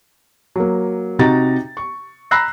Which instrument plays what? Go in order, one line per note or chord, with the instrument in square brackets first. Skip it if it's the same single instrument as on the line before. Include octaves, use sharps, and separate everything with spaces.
[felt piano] F#3 A#3
C3 D#4 F#4 A#5 A6
C#6
A#5 B5 E6 F#6 A#6 C7